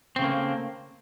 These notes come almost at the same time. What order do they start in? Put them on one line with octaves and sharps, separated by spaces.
C4 C#3 A3 A#3